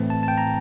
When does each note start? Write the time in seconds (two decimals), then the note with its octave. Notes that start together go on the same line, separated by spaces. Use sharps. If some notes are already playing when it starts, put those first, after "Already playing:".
Already playing: A2 E3 A3 C4
0.10 A5
0.23 A5
0.28 G5
0.38 A#5